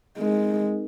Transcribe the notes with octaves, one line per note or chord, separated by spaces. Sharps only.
G#3 C4 D#4 A#4